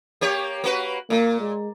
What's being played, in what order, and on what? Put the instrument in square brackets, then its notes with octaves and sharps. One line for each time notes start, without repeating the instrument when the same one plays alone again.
[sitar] A#3 G4 C#5
A#3 F#4 B4
[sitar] A#2 [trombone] A#3
[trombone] G#3